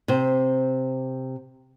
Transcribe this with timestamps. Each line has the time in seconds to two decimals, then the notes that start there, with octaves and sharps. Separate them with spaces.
0.08 C3 C5